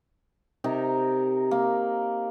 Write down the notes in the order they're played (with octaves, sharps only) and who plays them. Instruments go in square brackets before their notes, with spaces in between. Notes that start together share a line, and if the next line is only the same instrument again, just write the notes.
[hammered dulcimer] C3 D#4 G4 A#4
A#3